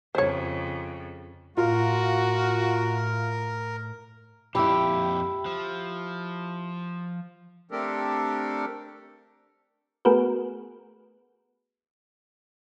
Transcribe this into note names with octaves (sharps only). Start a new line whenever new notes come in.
F2 C#3 C5 C#5
A2 F4 F#4 A#4
F2 A#2 E4 G4 B5 E6
F3
A3 C4 D4 G4 A4 A#4
A3 B3 F#4 G#4 A#4 B4